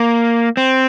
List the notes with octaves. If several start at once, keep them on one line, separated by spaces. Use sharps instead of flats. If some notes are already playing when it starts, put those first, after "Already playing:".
Already playing: A#3
C4